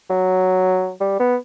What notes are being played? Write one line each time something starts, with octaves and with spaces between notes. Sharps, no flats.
F#3
G3
B3